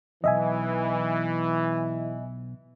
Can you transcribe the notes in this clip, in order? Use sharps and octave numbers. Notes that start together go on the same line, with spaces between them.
B1 E2 E3 D#5 E5 G#5